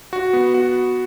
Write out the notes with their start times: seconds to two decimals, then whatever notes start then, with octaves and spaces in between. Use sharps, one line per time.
0.13 F#4
0.33 B3
0.54 F#4